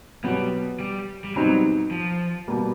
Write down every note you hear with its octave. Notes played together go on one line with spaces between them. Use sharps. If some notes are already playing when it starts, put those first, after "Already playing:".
B2 F#3 G3 B3
G3
G3
B2 F#3 G3 C4 D#4
F3
B2 G3 A#3